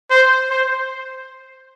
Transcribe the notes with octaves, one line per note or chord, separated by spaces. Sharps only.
C5
C5